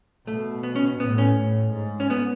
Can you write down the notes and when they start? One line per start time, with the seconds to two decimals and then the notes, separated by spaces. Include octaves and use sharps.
0.27 B2 A3
0.63 B3
0.76 C#4
1.00 A2 B3
1.18 C#4
1.36 A2
1.73 G#2
2.00 C#4
2.10 B3